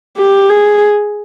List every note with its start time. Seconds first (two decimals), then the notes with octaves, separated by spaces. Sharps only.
0.17 G4
0.50 G#4